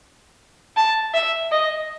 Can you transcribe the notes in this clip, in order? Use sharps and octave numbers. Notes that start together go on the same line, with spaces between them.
A5
E5
D#5